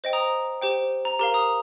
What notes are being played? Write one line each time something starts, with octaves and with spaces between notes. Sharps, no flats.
C5 D#5 G5
A#5 D#6
G4 C5 G5
A#5
G4 A#4 F5 A#5
A#5 D#6